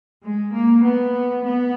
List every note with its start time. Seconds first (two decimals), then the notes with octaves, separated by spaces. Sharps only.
0.24 G#3
0.54 A#3
0.84 B3
1.45 B3